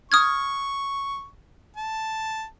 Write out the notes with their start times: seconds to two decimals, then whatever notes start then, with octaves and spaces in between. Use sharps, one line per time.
0.12 C#6 D#6 F6 G#6
1.76 A5